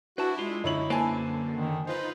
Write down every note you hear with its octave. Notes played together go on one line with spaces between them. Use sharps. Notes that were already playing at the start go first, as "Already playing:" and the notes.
D4 E4 F#4 B4 A5
G#3 F4
F#2 D3 D#4 E4 C#5 F#7
A#3 B4 C5 G#5 A5
D#3
D#4 F4 B4 C5